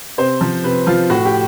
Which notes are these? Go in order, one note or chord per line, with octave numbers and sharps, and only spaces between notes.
C3 C5
F3
C3 B4
F3 F4
A2 F#4
G4